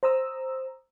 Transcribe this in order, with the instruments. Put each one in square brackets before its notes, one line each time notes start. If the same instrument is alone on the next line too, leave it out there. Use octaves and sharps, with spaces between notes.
[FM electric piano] C5 A#5 D#6 E6